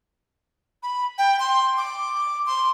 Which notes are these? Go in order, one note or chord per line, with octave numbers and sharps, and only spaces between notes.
B5
G5
C6
D6
C6